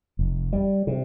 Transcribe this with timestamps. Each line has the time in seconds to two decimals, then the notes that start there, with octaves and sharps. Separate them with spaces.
0.19 F1
0.53 G3
0.87 C3